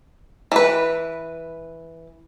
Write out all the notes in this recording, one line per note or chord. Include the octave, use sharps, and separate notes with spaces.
E3 B4